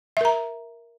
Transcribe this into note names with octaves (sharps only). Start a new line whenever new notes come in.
A#4 E5 A#5